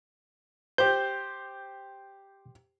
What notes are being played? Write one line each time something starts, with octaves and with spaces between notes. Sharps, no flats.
G4 C5 G6